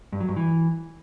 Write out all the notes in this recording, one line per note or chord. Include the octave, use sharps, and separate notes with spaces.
G2
F#3
G2
E3